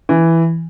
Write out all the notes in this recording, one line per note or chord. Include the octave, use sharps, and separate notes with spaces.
E3